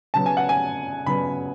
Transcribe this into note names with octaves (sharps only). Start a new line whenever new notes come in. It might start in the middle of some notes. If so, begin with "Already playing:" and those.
C#3 F#3 B3 A5
G#5
F#5
G#5
C#3 F#3 B3 B5